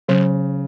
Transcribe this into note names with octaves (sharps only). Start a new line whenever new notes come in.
C#3 F#3